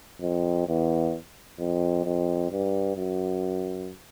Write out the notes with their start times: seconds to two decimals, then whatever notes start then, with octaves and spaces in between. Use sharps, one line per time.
0.21 F2
0.67 E2
1.59 F2
2.04 F2
2.51 G2
2.96 F#2